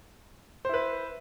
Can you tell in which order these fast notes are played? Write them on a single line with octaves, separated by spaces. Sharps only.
C5 E4 B4